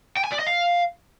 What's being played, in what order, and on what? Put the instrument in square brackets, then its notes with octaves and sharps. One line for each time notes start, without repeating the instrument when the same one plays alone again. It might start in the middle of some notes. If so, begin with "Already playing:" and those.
[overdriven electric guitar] G5
G#5
D5
D#5
F5